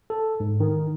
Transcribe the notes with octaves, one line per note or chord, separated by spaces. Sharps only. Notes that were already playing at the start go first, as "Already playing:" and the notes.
A4
G#2
D#3